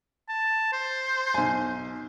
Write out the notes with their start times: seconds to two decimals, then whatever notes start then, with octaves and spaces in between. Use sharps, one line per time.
0.29 A5
0.73 C5
1.34 B1 G#5